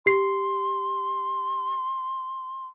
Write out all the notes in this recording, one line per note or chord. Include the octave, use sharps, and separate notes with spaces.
G4 C6 C7